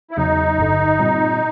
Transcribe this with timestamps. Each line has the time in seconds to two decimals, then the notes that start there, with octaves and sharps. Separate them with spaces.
0.11 E4
0.17 E2 C#3 F#3 D#4
0.58 G1 G2 D3
0.99 A#2 G3 C4